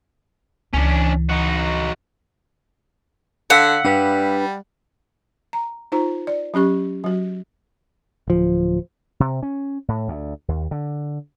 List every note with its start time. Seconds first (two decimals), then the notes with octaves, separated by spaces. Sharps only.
0.74 C#2 E3 C#4 D4
1.29 D#4 F#4
3.50 D3 F5 F#5 E6 B6
3.85 G3 D4 B4
5.53 A#5
5.92 D#4 F4 C5 A#5
6.27 D5
6.54 F#3 C#4 G4 C#6
7.04 F#3 F#4
8.28 D1 F3
9.20 C3
9.43 C#4
9.88 A2
10.08 D2
10.48 D#2
10.71 D3